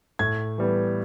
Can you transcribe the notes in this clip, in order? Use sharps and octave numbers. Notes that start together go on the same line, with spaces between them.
A2 G#6
E3 G3 B3